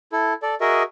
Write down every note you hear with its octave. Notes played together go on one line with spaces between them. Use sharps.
E4 A4
A4 D5
F#4 G#4 A#4 D#5 E5